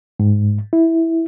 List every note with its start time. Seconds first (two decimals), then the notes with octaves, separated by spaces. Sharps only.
0.20 G#2
0.73 E4